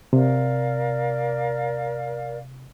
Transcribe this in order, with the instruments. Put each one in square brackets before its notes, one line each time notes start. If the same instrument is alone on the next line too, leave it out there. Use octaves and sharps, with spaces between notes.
[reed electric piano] C3 [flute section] A#4 D5 F5